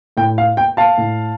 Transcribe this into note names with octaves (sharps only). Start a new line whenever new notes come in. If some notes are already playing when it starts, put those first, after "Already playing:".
A2 G5
F5
G5
F5 A5
A2